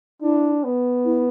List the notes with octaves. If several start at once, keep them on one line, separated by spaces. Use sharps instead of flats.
D4 E4
B3
E4